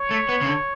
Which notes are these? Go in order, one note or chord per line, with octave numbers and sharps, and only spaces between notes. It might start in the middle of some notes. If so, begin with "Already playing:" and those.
Already playing: C#5
A3
B3
C#3
D3